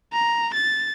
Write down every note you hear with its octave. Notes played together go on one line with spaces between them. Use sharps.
A#5
A6